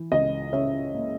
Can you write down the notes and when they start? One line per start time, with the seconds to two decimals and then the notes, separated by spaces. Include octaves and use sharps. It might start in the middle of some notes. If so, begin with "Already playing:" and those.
Already playing: E3
0.12 C#2 D#5
0.53 C#3 C#5 E5
0.94 A#3